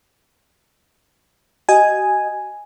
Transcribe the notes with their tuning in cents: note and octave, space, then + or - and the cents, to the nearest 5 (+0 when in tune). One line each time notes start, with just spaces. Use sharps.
F#4 +40 D#5 +0 G#5 +0